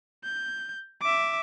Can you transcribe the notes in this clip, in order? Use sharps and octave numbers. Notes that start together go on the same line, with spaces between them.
G6
E5 D6